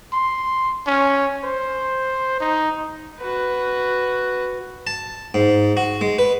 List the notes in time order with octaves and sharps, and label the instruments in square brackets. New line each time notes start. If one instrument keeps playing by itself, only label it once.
[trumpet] C6
C#4
C5
D#4
[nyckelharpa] F#4 B4
[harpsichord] A5
G#2
F#4
G#3
B4